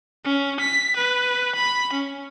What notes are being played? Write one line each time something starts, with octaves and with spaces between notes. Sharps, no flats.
C#4
B6
B4
B5
C#4